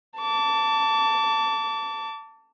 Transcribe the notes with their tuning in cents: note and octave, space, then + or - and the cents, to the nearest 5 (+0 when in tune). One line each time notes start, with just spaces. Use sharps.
A5 +15 D6 -30